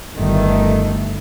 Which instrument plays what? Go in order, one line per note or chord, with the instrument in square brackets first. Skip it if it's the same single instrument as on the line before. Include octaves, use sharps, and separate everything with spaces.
[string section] G1 G2 D#3 A3